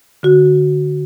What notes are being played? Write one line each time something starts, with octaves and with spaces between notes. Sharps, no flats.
D3 F#4